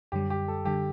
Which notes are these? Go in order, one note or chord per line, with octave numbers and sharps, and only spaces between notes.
F#2 D3 G3 G4
G4
A4
D3 G3 G4